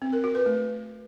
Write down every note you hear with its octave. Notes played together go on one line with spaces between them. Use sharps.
C4
A#4
F#4
B4
A3